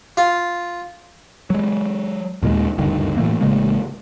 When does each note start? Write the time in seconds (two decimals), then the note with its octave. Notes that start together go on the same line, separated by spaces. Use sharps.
0.17 F4
1.50 F#3 G#3
2.42 D#2 A#2 D#3 G#3
2.78 F#1 D2 G2 D#3
3.17 A2 E3 A3 A#3
3.41 A1 C#3 G#3 A#3